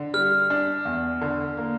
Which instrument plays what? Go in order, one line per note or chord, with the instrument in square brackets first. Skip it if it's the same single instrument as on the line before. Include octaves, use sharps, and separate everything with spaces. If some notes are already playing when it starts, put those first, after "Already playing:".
Already playing: [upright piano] D3
[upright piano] G3 [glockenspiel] F6
[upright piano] D4
E2
D3
A#3